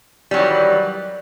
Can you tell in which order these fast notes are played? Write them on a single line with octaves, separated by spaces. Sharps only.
G3 F#3 D#3 E3